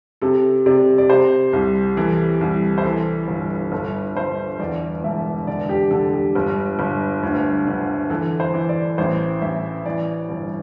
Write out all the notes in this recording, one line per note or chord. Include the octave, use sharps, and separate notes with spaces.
C3 A4
C3 D5
D5
C3 C5
C2
E3 A4
C2
C5
E3 A4
G1
G1 A4
G1 C5
E2 D5
E1 E5
D3 D5
G4
D3 A4
G4
G1
G1
D2
D3
E3 A4
C5
E3
D5
A1 C5
A1 E5
E3 D5
G1